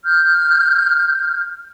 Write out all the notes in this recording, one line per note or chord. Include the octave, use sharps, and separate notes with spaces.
F6 G6